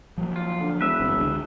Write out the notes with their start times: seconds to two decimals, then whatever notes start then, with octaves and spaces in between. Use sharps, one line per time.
0.18 F3 F#3 A#3
0.36 F4
0.60 D3
0.81 E1 B4 E5
1.00 G1 E3 C4
1.18 C#2 D3 G#3